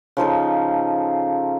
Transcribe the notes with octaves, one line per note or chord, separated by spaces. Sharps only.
C#3 F3 D#4 A4